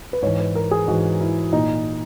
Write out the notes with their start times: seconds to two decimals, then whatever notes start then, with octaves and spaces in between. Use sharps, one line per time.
0.13 B4
0.22 G#2 E3 C#5
0.40 B4
0.55 A#4
0.71 G#4
0.88 G#2 E3 F#4
1.21 E4
1.53 A#2 D#4